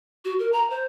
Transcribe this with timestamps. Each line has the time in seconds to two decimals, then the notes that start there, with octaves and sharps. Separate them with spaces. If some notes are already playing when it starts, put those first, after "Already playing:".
0.25 F#4
0.39 A#4
0.52 A#5
0.70 C5